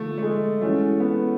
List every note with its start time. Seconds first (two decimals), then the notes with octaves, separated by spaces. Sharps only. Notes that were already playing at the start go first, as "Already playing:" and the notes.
Already playing: D3 F3 A3 A#3 D#4
0.18 A3
0.23 G#3
0.61 E3 G#3 A3 C#4 F#4
1.00 B3